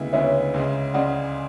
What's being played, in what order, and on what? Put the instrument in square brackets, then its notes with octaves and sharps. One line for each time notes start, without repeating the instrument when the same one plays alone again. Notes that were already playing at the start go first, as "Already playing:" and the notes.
Already playing: [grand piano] D2 C#3 G#3 B3 E4
[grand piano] D2 C#3 G#3 B3 E4 [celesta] C#5 E5
[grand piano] C#2 C#3 G#3
[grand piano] C#2 C#3 G#3 [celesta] D5 F#5